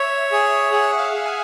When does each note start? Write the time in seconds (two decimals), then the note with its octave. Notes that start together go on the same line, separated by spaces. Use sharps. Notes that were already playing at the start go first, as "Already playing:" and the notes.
Already playing: C#5 E5
0.32 G#4
0.72 G#4 F#5
0.99 F5
1.13 G#4
1.26 G#5